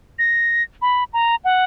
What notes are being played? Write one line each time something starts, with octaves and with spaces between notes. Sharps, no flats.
A#6
B5
A#5
F#5